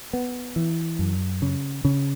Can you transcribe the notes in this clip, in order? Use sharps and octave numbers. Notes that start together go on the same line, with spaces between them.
B3
E3
F#2
C#3
C#3